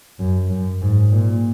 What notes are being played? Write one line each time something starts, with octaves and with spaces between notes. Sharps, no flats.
F#2
F#2
G#2
A#2